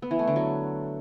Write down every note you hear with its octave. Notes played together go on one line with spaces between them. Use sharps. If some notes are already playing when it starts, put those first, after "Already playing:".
B3
E3
A3
D3
F#3